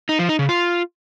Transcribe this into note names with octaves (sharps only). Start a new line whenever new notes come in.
D#4
F3
D#4
C#3
F4